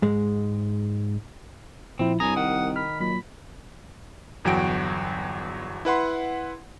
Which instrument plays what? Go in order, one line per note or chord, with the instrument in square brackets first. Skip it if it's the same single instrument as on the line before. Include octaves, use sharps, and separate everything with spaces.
[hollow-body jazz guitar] G#2 G#3
[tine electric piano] A#2 F3 E4 [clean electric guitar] C4
[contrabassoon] C2 [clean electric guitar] G2 A#5 [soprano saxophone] G#5 [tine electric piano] D#6
[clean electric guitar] D#3 [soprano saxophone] F#5
[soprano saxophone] B5 [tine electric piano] F6
[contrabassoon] A#2 [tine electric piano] F#3 [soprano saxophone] B5
[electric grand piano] G1 E2 F#3 F#4 G5 D7
E4 B4 F#5 C6